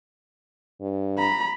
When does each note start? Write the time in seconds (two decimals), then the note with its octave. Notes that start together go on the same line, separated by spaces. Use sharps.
0.81 G2
1.18 A#5 B5